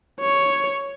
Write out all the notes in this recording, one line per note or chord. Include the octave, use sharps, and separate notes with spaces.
C#5